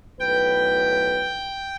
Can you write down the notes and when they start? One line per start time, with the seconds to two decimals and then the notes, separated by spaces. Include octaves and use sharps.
0.20 B1 A2 B4 G5